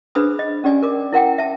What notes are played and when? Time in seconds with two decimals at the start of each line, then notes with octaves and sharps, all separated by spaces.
0.15 D4 G#4 B4 C5 B5 D#6
0.39 D#5
0.64 C#4 G4 D5 G#5
0.83 A#4 D6
1.12 E4 A#4 F#5 G5
1.38 E5 A5